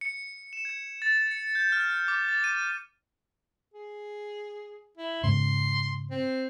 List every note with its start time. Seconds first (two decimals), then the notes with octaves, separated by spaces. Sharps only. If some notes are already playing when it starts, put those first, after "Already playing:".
0.01 C#7
0.53 E7
0.65 G#6
1.02 A6
1.31 C#7
1.55 G6
1.72 F6
2.08 D6
2.28 A6
2.44 D#7
3.74 G#4
4.97 E4
5.24 G#2 C#3 C6
6.11 C4